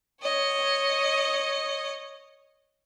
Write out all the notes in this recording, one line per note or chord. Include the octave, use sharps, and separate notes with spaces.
C#5 D#5